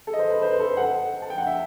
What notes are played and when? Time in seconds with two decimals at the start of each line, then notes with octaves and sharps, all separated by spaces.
0.07 A4
0.13 D#5
0.19 C5
0.30 B4
0.42 C5
0.51 B4
0.60 A4
0.68 C5
0.77 F#5
1.22 A5
1.30 G5
1.38 F#5
1.47 E5